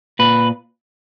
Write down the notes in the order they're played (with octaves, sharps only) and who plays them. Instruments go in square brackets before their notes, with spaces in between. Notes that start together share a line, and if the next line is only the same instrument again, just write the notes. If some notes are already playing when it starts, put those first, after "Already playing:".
[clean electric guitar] A#2 B4